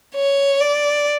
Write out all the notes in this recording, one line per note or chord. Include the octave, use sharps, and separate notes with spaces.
C#5
D5